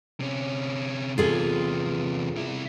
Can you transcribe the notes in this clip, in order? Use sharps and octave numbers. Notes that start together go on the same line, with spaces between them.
C3 C#4
E2 C3 F4 G#4 A4
C3 E4